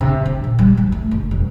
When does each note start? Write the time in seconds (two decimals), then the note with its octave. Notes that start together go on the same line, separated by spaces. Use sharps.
0.01 C3
0.26 D3
0.44 A#1
0.59 G3
0.77 F3
0.92 A3
1.11 F#1
1.31 E1